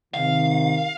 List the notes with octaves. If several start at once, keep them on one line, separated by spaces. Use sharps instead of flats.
C3 D#3 F5